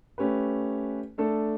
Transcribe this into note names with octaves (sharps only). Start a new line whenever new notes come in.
A3 C#4 G4 B4
A3 D4 A4